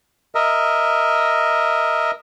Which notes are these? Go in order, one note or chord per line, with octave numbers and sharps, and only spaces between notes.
A#4 D#5 E5